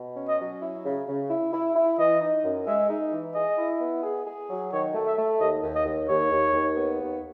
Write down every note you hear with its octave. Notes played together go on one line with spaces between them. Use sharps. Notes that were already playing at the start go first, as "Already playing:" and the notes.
Already playing: B2
C#4
D#5
F#3
E4
C#3
C#3
E4
E4
E4
E3 D#5
D#4
F#2
G#3 E5
D#4
E3
G#4 D#5
E4
B3
G#4
G#4
F#3
D#3 C#5
A3
E5
A3
D#2 D#5
D#2
D#5
D#2
D#2 C#5
D#2
D#2
B3
D#2